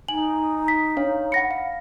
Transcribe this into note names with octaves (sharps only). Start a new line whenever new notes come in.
D#4 G#5 F#7
B6
D4 C#5 F5
F#5 B5 A#6 C#7
F5